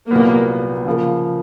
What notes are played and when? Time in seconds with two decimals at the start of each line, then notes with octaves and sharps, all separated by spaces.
0.11 C2 A#2 F#3 A#3 B3
0.86 C#3 F3 A#3